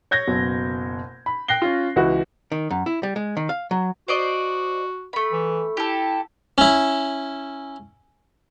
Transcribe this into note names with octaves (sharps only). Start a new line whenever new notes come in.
C#5 G6 G#6 A#6
F#1 B2 F#3
B5
G5 F#6 A#6 C7 G7
C#4 F4
C#2 E3 F#4
D#3
F#2
E4
G3
G#3
D#3
F5
F#3
F#4 C5 D5 D#5
A3 B5
E3
E4 G4 A4
C#4 E4